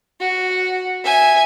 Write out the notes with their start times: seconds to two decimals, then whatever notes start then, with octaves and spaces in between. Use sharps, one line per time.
0.20 F#4
1.05 E5 G#5